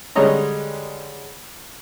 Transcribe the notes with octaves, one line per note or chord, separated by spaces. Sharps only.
D3 G3 G#3 C#5 D#5 A#5